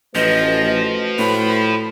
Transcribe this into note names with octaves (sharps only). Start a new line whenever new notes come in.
A1 F3 A3 F#4 B4 D#5
A2 B5